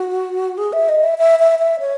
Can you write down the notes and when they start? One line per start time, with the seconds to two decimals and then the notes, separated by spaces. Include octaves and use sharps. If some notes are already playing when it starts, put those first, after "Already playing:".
Already playing: F#4
0.58 G#4
0.73 E5
0.89 D#5
1.04 E5
1.18 E5
1.39 E5
1.59 E5
1.80 C#5